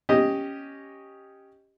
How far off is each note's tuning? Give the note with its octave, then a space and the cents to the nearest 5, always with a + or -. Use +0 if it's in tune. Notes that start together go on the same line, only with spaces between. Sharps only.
C#4 +0 G4 +0 D#5 +0